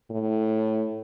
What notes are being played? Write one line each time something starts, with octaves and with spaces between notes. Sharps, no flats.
A2